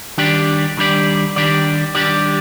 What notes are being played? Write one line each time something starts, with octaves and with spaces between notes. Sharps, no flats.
D#3 G3 D4 G4 D5
D#3 G3 D4 G4 D5
D#3 G3 D4 G4 D5
D#3 G3 D4 G4 D5